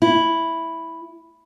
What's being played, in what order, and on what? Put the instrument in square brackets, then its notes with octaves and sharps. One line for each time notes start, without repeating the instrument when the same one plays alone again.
[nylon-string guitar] E4